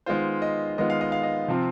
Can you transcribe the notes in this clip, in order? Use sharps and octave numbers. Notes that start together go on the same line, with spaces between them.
D#3 G#3 B3 F4 C5
D#5
D#3 G#3 B3 F4 D#5
F5
D#5
F5
D#5
C3 F3 C4 F4